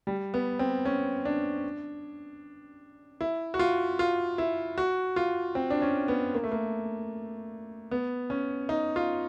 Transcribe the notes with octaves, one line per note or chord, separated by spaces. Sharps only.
G3
B3
C4
C#4
D4
E4
F#4
F4
F4
E4
F#4
F4
C4
D4
C#4
B3
A#3
A3
A#3
B3
C#4
D#4
F4